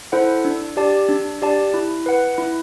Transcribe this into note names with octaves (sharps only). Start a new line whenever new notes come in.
E4 A4 C5 F#5
D4
G4 D5 A5
D4
G4 D5 A5
E4
B4 F#5
E4